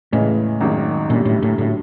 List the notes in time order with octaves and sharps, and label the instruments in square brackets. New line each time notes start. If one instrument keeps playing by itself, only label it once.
[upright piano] E2 C#3 E3 G#3 [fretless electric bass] A2
[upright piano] G#1 F#2 D#3 G#3
[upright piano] F#2 D3 G3 [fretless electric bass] A#2
[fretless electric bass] A2
A2
[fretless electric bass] A2 [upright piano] D3 F#3